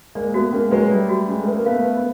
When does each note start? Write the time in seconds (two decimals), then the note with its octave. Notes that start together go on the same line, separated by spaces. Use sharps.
0.15 G#3 A#3 D5
0.34 A3 B3 F#4
0.52 G#3 A#3 C#4
0.71 F#3 G#3 B4
0.91 G3 A3 D5
1.09 F#4
1.28 G#3 C#4
1.43 A3 B4
1.54 A#3
1.66 A3 B3 F5
1.85 B4
1.97 B3